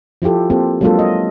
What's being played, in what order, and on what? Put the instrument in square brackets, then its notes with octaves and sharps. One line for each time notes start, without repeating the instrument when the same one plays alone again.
[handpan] F3 E4 F4 G4 A4
A#3 C4 G4 A4 C5
F#3 G#3 A#3 D4 F4 A4
D#5